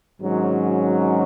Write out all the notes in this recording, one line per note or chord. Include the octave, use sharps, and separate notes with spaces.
G#1 G#2 F#3 C#4